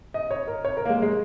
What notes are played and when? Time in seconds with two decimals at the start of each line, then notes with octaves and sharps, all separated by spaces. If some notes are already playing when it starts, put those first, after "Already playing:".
0.14 D#5
0.31 C#5
0.47 A#4
0.65 C#5
0.77 A#4
0.85 A#3
0.89 G#3
1.02 G#3